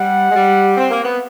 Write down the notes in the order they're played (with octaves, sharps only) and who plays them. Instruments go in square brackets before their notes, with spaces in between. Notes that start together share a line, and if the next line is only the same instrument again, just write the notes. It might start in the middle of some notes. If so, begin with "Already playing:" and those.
Already playing: [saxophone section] G3 [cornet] F#5
[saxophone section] G#3
G3
C4
A#3
B3